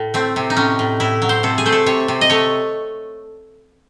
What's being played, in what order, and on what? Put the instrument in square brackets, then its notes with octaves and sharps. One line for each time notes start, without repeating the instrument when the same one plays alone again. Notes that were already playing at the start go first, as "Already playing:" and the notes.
Already playing: [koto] A2
A3 C4
C3
D#4
A2 C#4
A2
A2 E4
F#3
C5
C3 A4
G#4
A3 C5
A4
C3 C#5
C3
D#5
A3 C#5